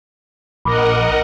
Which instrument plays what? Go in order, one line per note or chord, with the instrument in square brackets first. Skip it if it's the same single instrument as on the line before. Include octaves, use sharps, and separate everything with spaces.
[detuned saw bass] A#1 [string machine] A#4 D#5 F#5 [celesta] B5 D6